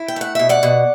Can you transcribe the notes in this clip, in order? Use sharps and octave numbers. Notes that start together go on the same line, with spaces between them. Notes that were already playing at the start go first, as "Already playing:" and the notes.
Already playing: E4
G5
A3 F#5
B2 E5
D5 F#5
B2